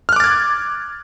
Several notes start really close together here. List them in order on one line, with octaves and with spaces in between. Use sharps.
F6 F#6 D6 A6 G#6